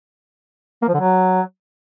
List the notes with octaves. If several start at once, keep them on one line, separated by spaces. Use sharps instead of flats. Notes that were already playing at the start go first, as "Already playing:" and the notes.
A#3
F3
D3
F#3